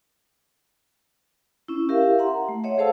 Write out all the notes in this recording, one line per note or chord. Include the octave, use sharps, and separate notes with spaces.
C#4 E4
E4 G4 A#4 E5 F5
E5 F#5 A#5 C6
A3
C#5 D#5 E5 F#5
G#4 A4 C5 F5 A5 E6